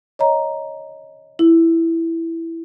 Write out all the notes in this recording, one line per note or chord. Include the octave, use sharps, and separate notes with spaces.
C#5 D#5 A#5
E4